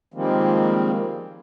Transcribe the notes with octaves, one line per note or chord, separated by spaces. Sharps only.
D#3 F3 G3 G#3 A#3 C4